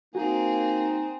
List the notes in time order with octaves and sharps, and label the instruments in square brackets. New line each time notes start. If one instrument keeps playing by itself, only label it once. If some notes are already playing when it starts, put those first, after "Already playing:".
[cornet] A#3 [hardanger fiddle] C4 G#4 [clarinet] D#4 [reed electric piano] F#4